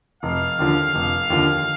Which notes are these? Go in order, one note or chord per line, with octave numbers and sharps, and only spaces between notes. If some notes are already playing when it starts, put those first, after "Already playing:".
F1 F5
D#2 D3 F3
F1
D#2 D3 F3